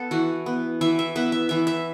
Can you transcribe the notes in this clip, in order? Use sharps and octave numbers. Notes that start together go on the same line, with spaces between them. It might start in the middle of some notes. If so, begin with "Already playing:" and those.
Already playing: B3 A4
E3 F#4
B3
E3 E5
E5
B3 E5
E5
E3 E5
E5